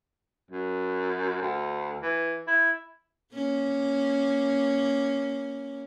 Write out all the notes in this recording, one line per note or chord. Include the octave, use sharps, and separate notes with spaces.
F#2
D2
E3
E4
A#3 C#4